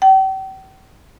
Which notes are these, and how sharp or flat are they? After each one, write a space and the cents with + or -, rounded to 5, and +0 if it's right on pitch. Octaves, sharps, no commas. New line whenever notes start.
G5 -40